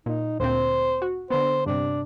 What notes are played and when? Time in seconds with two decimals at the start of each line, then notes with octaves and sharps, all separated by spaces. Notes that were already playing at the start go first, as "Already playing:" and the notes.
0.06 A#2 D#4
0.40 D2 A#2 C4 C5
1.02 F#4
1.30 D3 B3 C5
1.66 G2 C3 D4